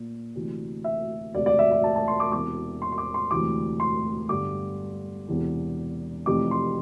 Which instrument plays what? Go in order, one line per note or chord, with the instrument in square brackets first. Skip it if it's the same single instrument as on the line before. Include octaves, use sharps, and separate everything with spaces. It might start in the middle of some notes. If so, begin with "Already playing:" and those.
Already playing: [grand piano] A#2
D2 C3 E3
E5
E1 D2 C3 D5
D5
E5
E5
A5
A5
C6
D6
E1 E2 C3 E3 D6
C6
C6
D6
C6
E1 D2 C3 E3 D6
C6
G1 G2 D3 D6
E1 E2 C3 E3
F1 F2 C3 E3 D6
C6